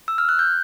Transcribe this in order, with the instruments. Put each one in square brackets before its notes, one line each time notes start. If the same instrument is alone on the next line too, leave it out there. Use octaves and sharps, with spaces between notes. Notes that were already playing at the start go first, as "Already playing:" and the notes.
[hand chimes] E6
F6
F#6
G6